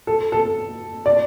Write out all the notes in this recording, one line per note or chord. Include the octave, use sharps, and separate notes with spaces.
A4
A4
D5